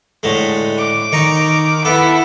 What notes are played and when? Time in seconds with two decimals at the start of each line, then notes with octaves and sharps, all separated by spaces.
0.23 A2 D3 G#3
0.78 D6
1.12 D#3 D#4 A#5 C#6
1.85 B3 E4 A4 E5 A5